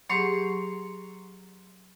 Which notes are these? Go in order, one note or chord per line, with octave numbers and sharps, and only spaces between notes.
F#3 G4 G#4 A#5 C6 C#6